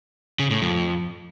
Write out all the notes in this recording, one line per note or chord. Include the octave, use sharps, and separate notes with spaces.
C#3
A2
F2